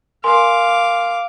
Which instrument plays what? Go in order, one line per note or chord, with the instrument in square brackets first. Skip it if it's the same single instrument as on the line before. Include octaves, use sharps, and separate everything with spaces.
[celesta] A#4 G#5 C6 [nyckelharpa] F5 D6